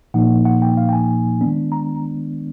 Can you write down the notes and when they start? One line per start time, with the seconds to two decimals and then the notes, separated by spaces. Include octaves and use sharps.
0.14 A#2 F3 A#3 D#4 F#5
0.45 F#5
0.62 G5
0.77 F5
0.89 G5
0.93 G#5
1.41 D#3 G#3 B3 D4
1.72 A#5